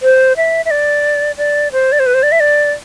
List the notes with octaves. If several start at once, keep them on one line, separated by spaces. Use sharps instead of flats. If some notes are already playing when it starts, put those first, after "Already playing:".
C5
E5
E5
D5
D5
C5
D5
C5
B4
C5
D5
E5
D5